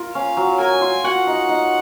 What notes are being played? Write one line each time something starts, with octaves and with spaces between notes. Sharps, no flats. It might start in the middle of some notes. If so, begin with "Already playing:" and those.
Already playing: F4 A#4
C#4 F5
F#3
A#4 G#5
F4
F#4 F#5
D#4
D#4